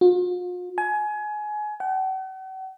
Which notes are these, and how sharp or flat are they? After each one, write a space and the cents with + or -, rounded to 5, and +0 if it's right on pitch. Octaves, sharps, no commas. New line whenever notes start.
F4 +45
G#5 +25
F#5 +45